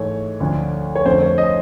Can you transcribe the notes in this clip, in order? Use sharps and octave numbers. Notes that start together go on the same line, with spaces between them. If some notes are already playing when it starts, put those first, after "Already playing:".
Already playing: G#2 E3 A3 C#5
D2 D3 F3
C#5
F2 D3 F3 A3 C5
C#5
D#5